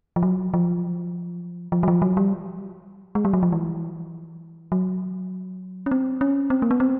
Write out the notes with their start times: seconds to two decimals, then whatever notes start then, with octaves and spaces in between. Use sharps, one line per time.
0.16 F3
0.23 F#3
0.54 F3
1.72 F3
1.83 F#3
1.88 F3
2.02 F#3
2.17 G3
3.15 G#3
3.25 G3
3.33 F#3
3.43 F3
3.52 E3
4.72 F#3
5.86 C#4
5.91 C4
6.21 C#4
6.50 C4
6.62 A#3
6.71 B3
6.80 C4